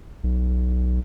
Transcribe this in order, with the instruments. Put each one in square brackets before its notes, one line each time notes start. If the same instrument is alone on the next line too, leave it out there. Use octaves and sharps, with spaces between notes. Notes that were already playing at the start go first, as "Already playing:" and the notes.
[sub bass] B1